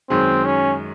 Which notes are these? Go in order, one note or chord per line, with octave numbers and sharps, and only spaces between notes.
F#2 D#3 G#3 C4
C#4